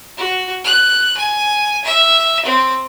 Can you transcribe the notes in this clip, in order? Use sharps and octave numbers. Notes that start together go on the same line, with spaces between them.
F#4
F#6
G#5
E5
C4